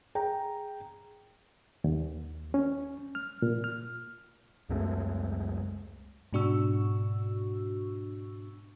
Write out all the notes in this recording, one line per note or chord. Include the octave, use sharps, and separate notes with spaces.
G#4 G5 A#5
D#2
C#4
F6
A#2
F6
C#2 F#2 G#3 A3
G#2 B2 D4 F#4 C#6 E6